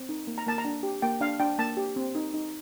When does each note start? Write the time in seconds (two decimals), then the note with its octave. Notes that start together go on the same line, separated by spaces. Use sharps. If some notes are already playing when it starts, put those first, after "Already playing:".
Already playing: C4
0.09 D#4
0.27 A#3
0.38 A#5
0.47 A#3 A5
0.58 A#5
0.65 D4
0.83 G4
1.02 A#3 G5
1.21 D4 F5
1.40 D4 G5
1.58 A#3 A5
1.77 G4
1.96 C4
2.15 D#4
2.34 D#4